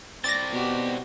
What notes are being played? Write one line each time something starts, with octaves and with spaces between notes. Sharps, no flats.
C4 D5 A6 A#6
B2 F#4 G4